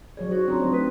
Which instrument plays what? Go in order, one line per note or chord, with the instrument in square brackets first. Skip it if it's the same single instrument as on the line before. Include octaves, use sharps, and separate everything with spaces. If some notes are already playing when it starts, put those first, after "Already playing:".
[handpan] F#3 C#5 D5 [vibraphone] G#4
[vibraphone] D#4 C#5 [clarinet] F#4 [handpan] C5
[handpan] C4 D4 F4 [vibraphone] D#4 A#5 C6
[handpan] F#3 A3 C5
[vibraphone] D#4 [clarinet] B4